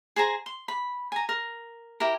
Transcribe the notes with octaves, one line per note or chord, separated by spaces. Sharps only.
G#4 C5 G#5 A#5
C6
B5
G#5 A#5
A#4
E4 G4 A#4